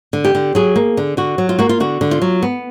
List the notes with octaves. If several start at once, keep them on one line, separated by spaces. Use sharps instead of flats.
D3
G4
D3
F#3 G#4
A#3
D3
D3 F#4
F#3
F4
A#3 F#4
F4
D3 F#4
D3
F4
F#3
B3